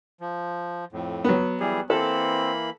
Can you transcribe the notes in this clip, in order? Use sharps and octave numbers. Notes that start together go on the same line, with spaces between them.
F3
F2 A2
F#3 B3
E3 G3 G#4
E3 A#3 C4 A4 B5